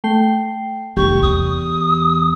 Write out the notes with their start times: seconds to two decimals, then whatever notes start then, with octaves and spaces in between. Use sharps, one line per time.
0.04 A3 G5 C7
0.97 F1 G4 C#6
1.22 E2 D#6